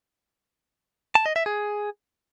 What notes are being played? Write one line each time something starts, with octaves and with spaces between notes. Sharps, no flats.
A5
D#5
E5
G#4